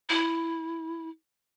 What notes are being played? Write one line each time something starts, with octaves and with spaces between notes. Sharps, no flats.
E4